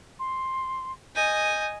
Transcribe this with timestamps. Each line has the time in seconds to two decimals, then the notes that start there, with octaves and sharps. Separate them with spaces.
0.19 C6
1.16 D#5 G#5 G6